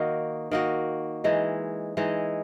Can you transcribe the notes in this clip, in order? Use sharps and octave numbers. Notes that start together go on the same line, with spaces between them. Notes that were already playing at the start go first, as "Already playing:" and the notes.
Already playing: D#3 A#3 D#4 F#4
D#3 A#3 D#4 F#4
E3 G#3 D#4
E3 G#3 D#4